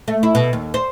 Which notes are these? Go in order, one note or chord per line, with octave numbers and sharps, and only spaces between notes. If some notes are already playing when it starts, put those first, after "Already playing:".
A3
E4
B2
D#2
C5